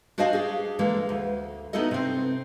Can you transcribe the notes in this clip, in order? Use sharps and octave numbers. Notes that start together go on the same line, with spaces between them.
D4 F#4 C5 D#5 F5 G#5
G4 G#4
D3 E3 G#3 A#3
D2
B3 D#4 E4 F#4 A4 D#5
C3 C4